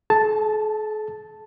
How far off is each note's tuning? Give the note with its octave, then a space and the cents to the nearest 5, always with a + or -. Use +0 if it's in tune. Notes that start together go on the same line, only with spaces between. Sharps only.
A4 -45 A5 +0